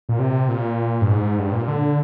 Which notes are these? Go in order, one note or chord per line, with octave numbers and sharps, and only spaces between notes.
A#2
C3
A#2
G2
G#2
G2
A#2
D3